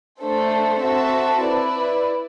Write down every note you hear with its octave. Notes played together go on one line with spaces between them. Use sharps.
A3 D4 A4 C5
C4 F#4 A4 E5 A5
E4 B4 D5